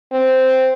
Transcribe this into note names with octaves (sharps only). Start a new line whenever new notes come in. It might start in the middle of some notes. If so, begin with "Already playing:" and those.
C4